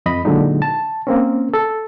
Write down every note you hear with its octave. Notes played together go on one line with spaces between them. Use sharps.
F2 D#5 B5
A#2 D3 F#3 G#3 D#4
A5
A#3 C4 C#4
A4